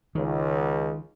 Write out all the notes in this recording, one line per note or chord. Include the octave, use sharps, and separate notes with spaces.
C#2 D#3